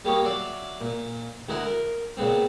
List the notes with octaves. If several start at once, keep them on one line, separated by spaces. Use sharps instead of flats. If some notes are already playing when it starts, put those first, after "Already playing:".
G3 A#3 G4 C#5 D#5
F#3 D5 E5 F5
A#2
D2 E4 A#4 D#5 F#5 G#5
A#4
A#2 C#3 B3 C4